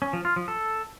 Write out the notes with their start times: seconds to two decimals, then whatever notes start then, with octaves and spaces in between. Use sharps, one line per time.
0.02 C#4
0.13 F3
0.25 F4
0.36 F3
0.48 A4